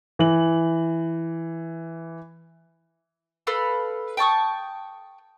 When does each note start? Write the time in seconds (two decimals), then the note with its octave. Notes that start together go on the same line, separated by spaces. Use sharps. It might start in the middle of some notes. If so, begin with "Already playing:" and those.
0.19 E3 F#7
3.47 A4 B4 F5 B5
4.17 G5 A5 C#6 D#6